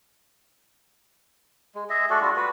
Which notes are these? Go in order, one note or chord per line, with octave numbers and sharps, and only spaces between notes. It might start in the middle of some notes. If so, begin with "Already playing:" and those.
G#3
G#4 D#5 E5
A3 F#4 A4 D5
G3 D4 F4 F#4
F#4 B4